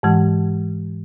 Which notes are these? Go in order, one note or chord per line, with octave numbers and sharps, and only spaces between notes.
G#2 E3 G#3